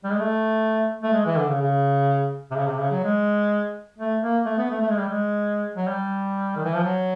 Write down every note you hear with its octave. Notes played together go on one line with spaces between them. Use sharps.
G3
G#3
A3
A3
G#3
E3
D3
C#3
C#3
C3
C#3
C3
C#3
F#3
G#3
A3
A#3
A3
B3
A3
A3
G#3
G3
G#3
F#3
G3
D#3
E3
F3
F#3